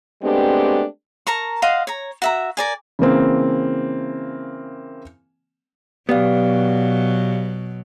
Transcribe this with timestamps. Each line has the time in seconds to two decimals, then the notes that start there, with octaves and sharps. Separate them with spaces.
0.23 G#3 A3 B3 C4 D4 G4
1.27 A#4 A5 A#5 C#6
1.62 D#5 F5 F#5 C6
1.87 C#5 A#5
2.22 F#4 E5 A#5
2.57 A#4 D5 G#5
2.99 C#3 E3 A#3 C4
6.09 B2 F#3 B3 G4 D5 F5